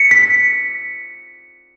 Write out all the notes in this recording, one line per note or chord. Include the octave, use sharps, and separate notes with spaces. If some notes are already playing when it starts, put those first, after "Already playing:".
Already playing: B6 C#7
B6